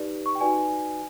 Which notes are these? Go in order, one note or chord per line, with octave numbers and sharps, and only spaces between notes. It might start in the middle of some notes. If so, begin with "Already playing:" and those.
Already playing: D#4 G4 B4 D5
C#6
G5
D#4 F#4 B4 D5 G#5